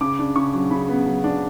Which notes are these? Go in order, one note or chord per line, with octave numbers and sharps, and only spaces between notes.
C#3 D6
D4
C#3 C#6
F#3
C#3 B5
B3
F#3
D4